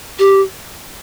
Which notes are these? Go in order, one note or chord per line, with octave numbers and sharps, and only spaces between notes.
G4